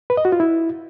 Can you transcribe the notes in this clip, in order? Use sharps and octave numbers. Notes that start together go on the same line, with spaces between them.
B4
D#5
F#4
F4
E4